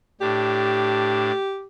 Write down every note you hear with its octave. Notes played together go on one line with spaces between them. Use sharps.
A2 D4 G4